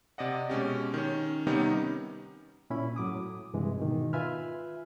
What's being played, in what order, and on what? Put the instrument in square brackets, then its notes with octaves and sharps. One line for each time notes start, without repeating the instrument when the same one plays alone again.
[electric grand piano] C3 D5 D#5 F#5
B2 G#3 C#4 G4
D#3 C#4
C3 D#3 G3 B3 C#4 D#4
[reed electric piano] A#2 C#4 E4 B5
A2 F#3 D6 D#6
G2 C3 E3 G#3
G#2 B2 D#3
F4 B4 E5 G#5 B5 F6